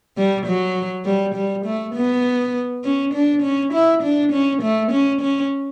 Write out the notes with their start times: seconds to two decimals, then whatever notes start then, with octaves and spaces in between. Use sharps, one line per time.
0.17 G3
0.46 F#3
1.05 G3
1.35 G3
1.66 A3
1.95 B3
2.84 C#4
3.14 D4
3.42 C#4
3.73 E4
4.03 D4
4.32 C#4
4.62 A3
4.92 C#4
5.21 C#4